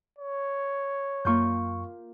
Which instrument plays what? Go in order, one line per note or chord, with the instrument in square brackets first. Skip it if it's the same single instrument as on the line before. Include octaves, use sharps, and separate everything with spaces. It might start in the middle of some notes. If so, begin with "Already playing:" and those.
[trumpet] C#5
[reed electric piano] F#2 C#6 [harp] A#3 F4 G6